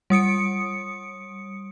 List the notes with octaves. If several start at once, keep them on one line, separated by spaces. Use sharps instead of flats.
G3 D#6 C#7 D7